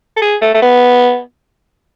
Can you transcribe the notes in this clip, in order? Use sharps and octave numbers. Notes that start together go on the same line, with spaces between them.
A4
G#4
A3
A3
B3